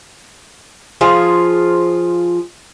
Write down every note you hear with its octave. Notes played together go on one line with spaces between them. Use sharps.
F3 F4 G#4